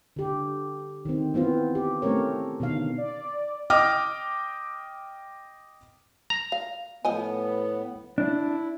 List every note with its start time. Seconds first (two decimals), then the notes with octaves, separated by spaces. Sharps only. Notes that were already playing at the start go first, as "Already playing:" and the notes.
0.16 D3 G4
1.05 D#3 C4
1.34 E3 B3 C4 F4
1.75 G4
2.02 A3 C4 C#4 A#4 C#5
2.60 B2 D3 D#3 F5
2.98 D5
3.70 D#5 G5 D6 F6
6.30 A#5
6.52 F5
7.05 A2 F3 B3 D#5 G#5
8.18 D4 E4